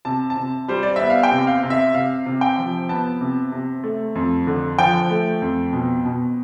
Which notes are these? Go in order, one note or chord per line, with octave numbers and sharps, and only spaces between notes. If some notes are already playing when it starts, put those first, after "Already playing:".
C3 A5
A5
C3
G3 C5
D5
B3 E5
F5
G5
C3
F5
C3
E5
C3 F5
C3
G5
F3
B3 A5
C3
C3
A3
F2
D3
F3 G5
A3
F2
B2
B2